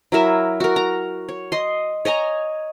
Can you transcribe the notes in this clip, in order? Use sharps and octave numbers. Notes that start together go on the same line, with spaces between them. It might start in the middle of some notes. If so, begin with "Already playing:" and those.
F#3 E4 A#4 E5
F#4 A#4
A#5
C#5
D#5 C6
C#5 D#5 G#5 A#5